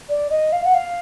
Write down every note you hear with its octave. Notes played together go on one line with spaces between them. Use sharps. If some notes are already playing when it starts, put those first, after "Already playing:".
D5
D#5
F5
F#5
F5